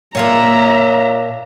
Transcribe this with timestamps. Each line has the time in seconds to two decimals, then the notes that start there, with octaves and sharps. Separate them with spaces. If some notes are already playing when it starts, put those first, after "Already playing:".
0.15 A#2 A#3 D4 F4 C#5 E5 A#5